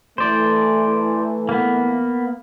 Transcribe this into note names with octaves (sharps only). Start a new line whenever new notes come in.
E3 A3 C5 D5
A#3 B3